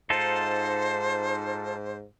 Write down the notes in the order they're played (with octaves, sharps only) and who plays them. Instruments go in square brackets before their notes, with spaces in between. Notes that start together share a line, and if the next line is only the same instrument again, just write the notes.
[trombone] G#2 [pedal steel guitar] D#4 F4 A4 [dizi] C5